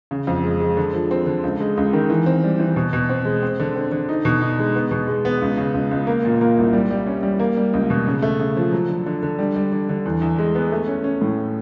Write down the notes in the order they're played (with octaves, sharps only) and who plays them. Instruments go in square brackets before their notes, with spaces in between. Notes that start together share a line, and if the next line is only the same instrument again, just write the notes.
[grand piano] C#3
F2
G#3
G#3
D3
F3
C4
D3
C#2
G#3
C#2
D#3
E3
C4
G3
E3
B2
B2
C4
G#3
C4
D3
C4
D3
D#4
B2
D#4
G#3
B3
B2
G#3
B3
C#2
C#3
C#2
C#2
A#3
A#2
A#3
C2
G3
G3
C#4
G3
A#3
G3
C#2
B2
C#3
A3
C#3
F3
F#3
D3
D3
D3
G3
G3
D3
D3
E2
E2
G#3
B3
A3
C#4
C#4
A2